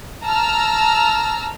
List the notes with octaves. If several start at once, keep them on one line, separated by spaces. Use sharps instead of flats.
A5 A#5 E6 F6